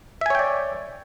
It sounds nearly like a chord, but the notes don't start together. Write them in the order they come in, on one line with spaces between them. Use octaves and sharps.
E5 G#5 C#5 G5 D5